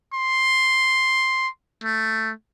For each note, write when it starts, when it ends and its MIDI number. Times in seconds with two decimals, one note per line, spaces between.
0.13 1.48 84
1.84 2.32 57